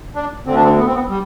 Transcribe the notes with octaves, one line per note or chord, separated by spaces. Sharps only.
D4
D2 D3 C4
D4
C4
B3
C4
B3
G3